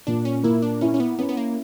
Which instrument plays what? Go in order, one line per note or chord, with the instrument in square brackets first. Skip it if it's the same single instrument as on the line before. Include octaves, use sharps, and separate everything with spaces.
[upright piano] A#2 [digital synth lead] D4
[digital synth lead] C#4
[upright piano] A#3 [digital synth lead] E4
[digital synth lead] D4
[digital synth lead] C#4 [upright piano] E4
[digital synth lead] C#4
B3
[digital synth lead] B3 [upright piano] C#4
[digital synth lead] B3
A#3